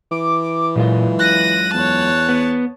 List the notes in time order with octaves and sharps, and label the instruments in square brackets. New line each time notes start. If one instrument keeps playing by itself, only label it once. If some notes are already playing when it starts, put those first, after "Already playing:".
[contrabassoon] E3 [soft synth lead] D6
[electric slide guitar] F#2 G#3 F4 [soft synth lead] A#2
[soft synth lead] F#6 [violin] A#6 D#7
[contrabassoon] E2 [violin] C#5 A5
[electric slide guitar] B3